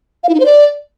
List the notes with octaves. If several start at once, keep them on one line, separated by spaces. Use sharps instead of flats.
F5
E4
D#4
C5
D5